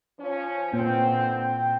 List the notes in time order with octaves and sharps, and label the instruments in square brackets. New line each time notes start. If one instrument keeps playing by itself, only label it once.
[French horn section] F3 C#4
[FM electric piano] A#2 [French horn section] D3 E3 C4 [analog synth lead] G5